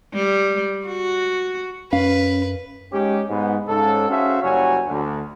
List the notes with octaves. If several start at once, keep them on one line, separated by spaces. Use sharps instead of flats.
G3
F#4
F#2 C#4 B4 F5
G#3 C#4 D#4 G4
G#2 B3
G#2 C#3 A4
C#4 F#4 G#4 C5 E5 F5
F#1 F#3 G3 F#4 C#5 G#5
D2